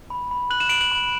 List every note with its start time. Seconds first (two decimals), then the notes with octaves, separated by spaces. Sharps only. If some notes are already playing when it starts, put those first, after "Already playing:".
0.10 B5
0.31 B5
0.50 F#6 F#7
0.60 E7
0.69 B5 D7 F#7
0.81 D7 F#7
0.92 B5